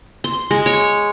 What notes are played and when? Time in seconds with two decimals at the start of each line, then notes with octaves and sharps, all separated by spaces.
0.24 C6
0.51 G#3
0.66 C#5